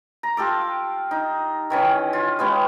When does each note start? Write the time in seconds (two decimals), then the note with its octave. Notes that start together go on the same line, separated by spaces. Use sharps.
0.23 A#5
0.37 F4 G4 A4 D6
1.11 D#4
1.70 D#3 E3 C#4
2.13 F4
2.39 G#3 B3 C#4 G4